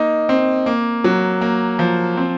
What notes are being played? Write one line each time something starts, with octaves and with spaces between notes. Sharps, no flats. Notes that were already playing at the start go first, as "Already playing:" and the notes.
Already playing: A#3 D#4
C4
A#3
F#3
A#3
F3
C4